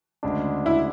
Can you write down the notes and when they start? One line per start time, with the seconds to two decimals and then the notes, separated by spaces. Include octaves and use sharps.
0.23 D2 C#3 G#3 D4
0.66 E4